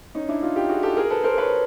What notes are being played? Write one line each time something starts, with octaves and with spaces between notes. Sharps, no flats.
C#4 D#4
D4 E4
D#4 F4
F4 G4
F#4 G#4
G4 A4
G#4 A#4
A4 B4
A#4 C5
B4 C#5